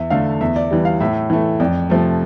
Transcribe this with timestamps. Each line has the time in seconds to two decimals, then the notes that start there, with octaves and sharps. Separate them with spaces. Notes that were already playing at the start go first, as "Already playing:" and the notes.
Already playing: E2 E5
0.10 D3 A3 F5
0.41 E2 E5
0.56 D5
0.71 E3 G3
0.85 F5
1.00 A2 E5
1.30 E3 A3
1.60 F2 D5
1.90 C3 F3 A3